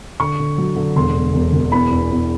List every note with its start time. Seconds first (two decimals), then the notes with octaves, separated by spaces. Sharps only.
0.20 D3 C#6
0.39 D3
0.58 F#3
0.76 D3
0.96 E1 C6
1.15 E1
1.34 E1
1.53 E1
1.72 E2 B5
1.91 E2
2.11 E2